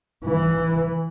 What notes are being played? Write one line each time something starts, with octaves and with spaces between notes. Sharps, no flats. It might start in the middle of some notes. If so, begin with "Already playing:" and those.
E3